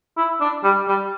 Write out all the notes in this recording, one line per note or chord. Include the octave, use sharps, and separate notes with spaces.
E4
D4
G3
G3